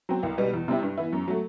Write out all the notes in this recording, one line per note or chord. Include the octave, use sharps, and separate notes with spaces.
F#3 C4
C2
B2 G3 B3
E2
C3 G3 C4 E4
G2
E3 B3 E4
F#2
F#3 A3